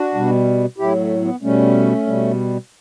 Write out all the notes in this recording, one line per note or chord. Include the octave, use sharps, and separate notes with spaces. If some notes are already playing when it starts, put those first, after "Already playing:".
Already playing: D4 F#4
B2 G3
A2 F#3 E4 G4
A3
B3
B2 G3 A3 C#4
B2 G3